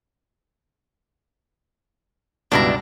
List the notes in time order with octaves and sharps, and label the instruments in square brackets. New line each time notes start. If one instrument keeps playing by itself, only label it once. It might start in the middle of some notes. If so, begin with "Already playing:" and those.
[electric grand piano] C#2 G2 B2 [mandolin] D4 E4 A#5